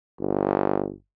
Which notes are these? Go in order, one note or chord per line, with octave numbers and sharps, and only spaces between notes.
G1